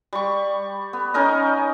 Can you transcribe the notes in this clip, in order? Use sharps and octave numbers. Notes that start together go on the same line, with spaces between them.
G3 C#6
B3
C#4 D#4 A#4 D#5